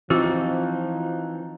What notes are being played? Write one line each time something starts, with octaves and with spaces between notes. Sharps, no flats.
E3 F3 C4 D#4 F4 F#4